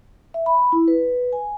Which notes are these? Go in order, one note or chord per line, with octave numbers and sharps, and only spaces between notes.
E5
B5
E4
B4
G#5